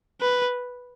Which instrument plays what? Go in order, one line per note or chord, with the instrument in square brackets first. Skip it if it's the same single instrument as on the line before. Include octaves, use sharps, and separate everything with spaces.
[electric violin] B4